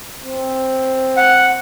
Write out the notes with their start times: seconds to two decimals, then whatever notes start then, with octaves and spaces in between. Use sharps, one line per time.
0.24 C4
1.17 F#5